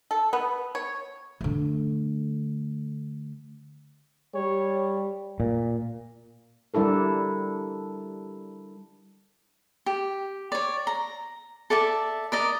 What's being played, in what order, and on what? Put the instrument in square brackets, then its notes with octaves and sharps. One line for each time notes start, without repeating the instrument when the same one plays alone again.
[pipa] A4
B3
C#5
[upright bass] D3 A3
[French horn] G3 [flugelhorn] C#5
[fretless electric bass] A#2
[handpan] G3 D4 E4 A4 A#4
[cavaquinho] G4
C#5 D5
A#5
A4 D5 E5 A5
A#4 D5 D#5